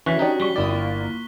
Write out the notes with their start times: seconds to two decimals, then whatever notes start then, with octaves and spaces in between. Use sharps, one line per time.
0.06 E3 C#4 F#4 C#6 F#6 B6
0.19 D4 D#4 G4 D5
0.40 G3 C#6 B6 G7
0.56 G1 E4 A#4 D5 G5 D#6
0.70 A#3 F4